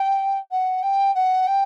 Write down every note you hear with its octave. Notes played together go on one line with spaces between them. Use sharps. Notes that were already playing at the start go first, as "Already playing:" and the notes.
Already playing: G5
F#5
G5
F#5
G5